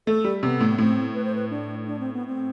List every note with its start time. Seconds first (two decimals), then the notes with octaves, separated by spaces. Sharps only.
0.07 A3 A4
0.24 G3
0.43 C3 B3
0.60 A2
0.69 B3
0.78 A2 C4
1.14 B4
1.25 C5
1.35 B4
1.50 D4
1.86 D4
1.99 C4
2.13 B3
2.26 C4